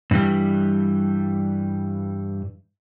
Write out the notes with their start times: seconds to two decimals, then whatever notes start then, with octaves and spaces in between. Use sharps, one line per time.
0.11 G2 E3 G3